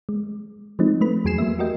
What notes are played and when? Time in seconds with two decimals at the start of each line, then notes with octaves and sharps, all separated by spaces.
0.09 G#3
0.79 F3 G#3 A3 C4 D#4
1.01 A3 B4 B5
1.25 E2 F#3 G#4 G#5 C7 E7
1.38 F#3 A3 A#3 E5
1.59 F#4 G4 A#4 D#5 G5